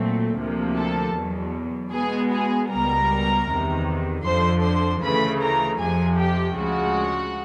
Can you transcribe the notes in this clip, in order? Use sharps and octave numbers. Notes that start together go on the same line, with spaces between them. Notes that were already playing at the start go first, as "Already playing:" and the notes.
Already playing: A#2 F#3 A3 C4
D2 C3 F3 A#3
A4 A5
E2 B2 F#3
B2 G#3 B3 G#4 G#5
G#4 G#5
C#2 B2 G3 A#4 A#5
E2 C3 D#3
F2 D3 F3 C5 C6
C5 C6
D2 C#3 E3 A3 B4 B5
A#4 A#5
F2 C3 F3 G#4 G#5
G4 G5
D2 C#3 F3 G#3 F#4 F#5